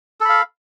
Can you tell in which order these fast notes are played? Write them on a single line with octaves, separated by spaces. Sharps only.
A4 B5 F5